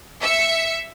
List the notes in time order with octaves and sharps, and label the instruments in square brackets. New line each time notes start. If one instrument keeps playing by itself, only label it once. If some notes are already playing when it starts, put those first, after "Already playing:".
[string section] E5 C#7